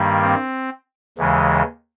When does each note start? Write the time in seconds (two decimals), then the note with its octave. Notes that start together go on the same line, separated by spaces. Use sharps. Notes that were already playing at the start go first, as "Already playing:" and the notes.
Already playing: G2 D#3 G3 A#3
0.22 C4
1.18 D#2 C#3 E3 G#3